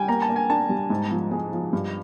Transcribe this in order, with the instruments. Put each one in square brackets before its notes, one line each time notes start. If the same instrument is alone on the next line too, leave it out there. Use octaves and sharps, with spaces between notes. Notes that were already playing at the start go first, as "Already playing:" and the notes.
Already playing: [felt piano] G3 [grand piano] G5 G#5
[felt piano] A#3 [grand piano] A#5
[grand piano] A5
[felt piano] A#3
[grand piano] G#5
[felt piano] D4 [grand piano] A5
[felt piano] G3
G#2
F3
G#3
F3
G2